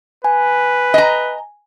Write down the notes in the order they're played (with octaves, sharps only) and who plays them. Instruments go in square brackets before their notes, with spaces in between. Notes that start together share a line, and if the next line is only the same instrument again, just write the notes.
[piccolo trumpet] B4 [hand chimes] G#5
[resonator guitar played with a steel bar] D#5 A#5